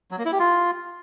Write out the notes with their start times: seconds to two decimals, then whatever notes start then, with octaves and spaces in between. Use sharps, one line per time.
0.11 F#3
0.18 A#3
0.25 E4
0.32 G4
0.39 F4